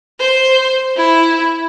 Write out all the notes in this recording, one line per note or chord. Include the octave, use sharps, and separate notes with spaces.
C5
E4